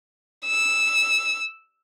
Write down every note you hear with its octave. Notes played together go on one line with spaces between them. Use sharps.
E6